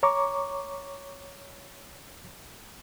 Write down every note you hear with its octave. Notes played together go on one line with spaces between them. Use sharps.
C#5 A#5 C#6 D6